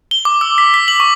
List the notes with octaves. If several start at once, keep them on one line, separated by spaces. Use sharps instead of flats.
G7
D6
E6
B6
B6
F#7
C#6